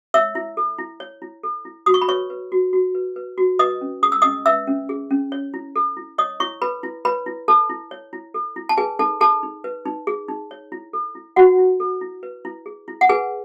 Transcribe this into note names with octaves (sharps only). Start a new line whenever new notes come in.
C#5 E5 E6
E4
A4
E4
C#5
E4
A4
E4
F#4 D#6
C#6
B5
B4 C#5 C#6
B4
F#4
F#4
B4
B4
F#4
B4 D#5 D#6
C#4
G#4 D#6
E6
C#4 D#5 D#6
B4 E5 E6
C#4
G#4
C#4
C#5
E4
A4
E4
C#5 D#5 D#6
E4 C#5 C#6
A4 B4 B5
E4
B4 C#5 B5
E4
A4 A5
E4
C#5
E4
A4
E4
A5
G#4 B4 G#5
D#4 A4 A5
G#4 A4 A5
D#4
B4
D#4
G#4
D#4
C#5
E4
A4
E4
F#4 C#5 F#5
E4
A4
E4
B4
E4
G#4
E4
F#5
G#4 B4 G#5